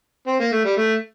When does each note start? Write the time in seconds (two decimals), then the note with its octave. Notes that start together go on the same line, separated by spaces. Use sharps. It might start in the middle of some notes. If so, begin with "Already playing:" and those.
0.27 C4
0.40 A#3
0.52 A3
0.64 G3
0.77 A3